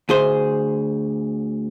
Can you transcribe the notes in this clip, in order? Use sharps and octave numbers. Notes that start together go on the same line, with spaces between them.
D2 G#4 C5